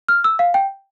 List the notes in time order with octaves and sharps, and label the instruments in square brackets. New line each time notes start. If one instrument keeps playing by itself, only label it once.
[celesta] F6
E6
F5
G5